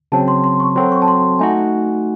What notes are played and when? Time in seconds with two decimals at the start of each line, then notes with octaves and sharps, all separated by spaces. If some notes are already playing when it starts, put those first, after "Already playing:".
0.12 C#3 F#3 C4 A5
0.28 C6
0.44 C6
0.60 C#6
0.76 F#3 C4 F#4 A4 C6
0.92 C#6
1.02 A5
1.08 C6
1.39 A3 D#4 F#4 G#5